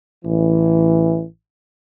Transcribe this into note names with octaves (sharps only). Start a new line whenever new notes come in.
A1 E3